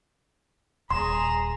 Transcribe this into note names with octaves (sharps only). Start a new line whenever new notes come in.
D#1 G#4 A#5 C6 E7